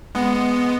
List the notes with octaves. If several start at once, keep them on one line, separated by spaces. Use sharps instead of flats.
G#3 B3